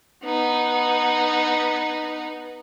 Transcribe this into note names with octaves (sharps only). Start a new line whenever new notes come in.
B3 D#4